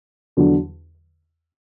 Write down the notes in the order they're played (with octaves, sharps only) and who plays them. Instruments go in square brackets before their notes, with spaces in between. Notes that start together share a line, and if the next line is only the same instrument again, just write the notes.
[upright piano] E2 D3 F#3